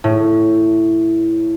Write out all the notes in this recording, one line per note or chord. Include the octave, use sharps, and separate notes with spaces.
A2